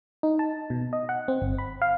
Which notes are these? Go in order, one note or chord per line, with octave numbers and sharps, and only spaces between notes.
D#4
A5
B2
D#5
F#5
C4
G1
B5
F5